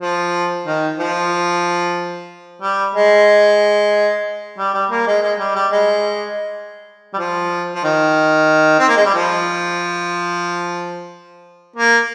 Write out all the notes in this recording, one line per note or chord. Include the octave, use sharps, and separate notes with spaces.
F3
D#3
F3
G3
G#3
G3
G3
A#3
G#3
G#3
G3
G3
G#3
G3
F3
F3
D#3
C4
A#3
G#3
G3
F3
A#3